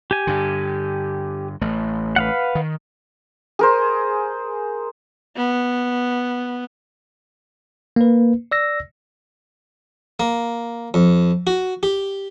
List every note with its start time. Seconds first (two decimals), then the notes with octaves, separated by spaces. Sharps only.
0.11 G4 G#5
0.27 G2 D3
1.61 A1 A3
2.16 B4 F5 F#5
2.55 D#3
3.59 G#4 A#4 C5
5.37 B3
7.96 A#3 B4
8.51 D5 E6 A#6
10.20 A#3
10.94 F2
11.47 F#4
11.83 G4